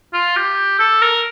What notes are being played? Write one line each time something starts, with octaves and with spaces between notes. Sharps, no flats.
F4
G4
A4
A#4